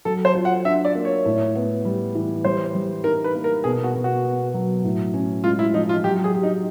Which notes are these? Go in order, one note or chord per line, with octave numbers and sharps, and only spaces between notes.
F#3 A4
C5
F4
F#5
D4 E5
D5
A#3
C#5
A2
B3
G3
E3
G3 C5
G3
D#4 A#4
B4
A#3
A#4
B2 G#4
F#4
B2
F#4
B3
F#3
A2
C#4
G#3 F4
E4
F3 D#4
F4
F#3 G4
G#4
G4
D#4